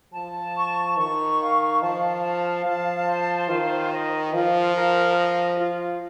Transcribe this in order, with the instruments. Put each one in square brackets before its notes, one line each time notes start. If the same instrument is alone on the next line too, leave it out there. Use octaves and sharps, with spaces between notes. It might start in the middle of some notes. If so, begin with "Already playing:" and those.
[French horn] F3 [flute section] A5
[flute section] C#6
[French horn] D#3 [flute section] C#6
[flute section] F5
[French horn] F3 [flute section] A5
[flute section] F5
[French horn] F3 [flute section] A5
[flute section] C5
[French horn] D#3 [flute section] F4
[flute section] D#5
[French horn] F3 [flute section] F4
[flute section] A#4
D#5
F4